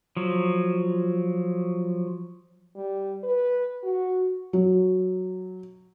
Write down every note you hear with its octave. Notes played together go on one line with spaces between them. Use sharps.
F3 F#3
G3
B4
F#4
F#3